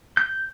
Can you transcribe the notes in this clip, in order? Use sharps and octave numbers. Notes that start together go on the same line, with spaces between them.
G6